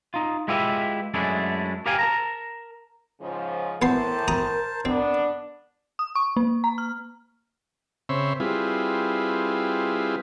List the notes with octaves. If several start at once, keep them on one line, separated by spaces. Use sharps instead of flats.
D#4 F4
G#3 E4 F4 G4 B4 E5
F#2 G#3 A3 D4 E4
G4 A#4 F5 G5 G#5
A#4 A5 A#5
G#2 C#3 F3
A2 E3 B3 A#4 C5 A5 C6
A#5 D#6
B3 C4 D4
D#6
C#6
A#3
A#5
F6
C#3 C4 C5 C#5 E5 B5
G3 C4 E4 F4 G#4 B4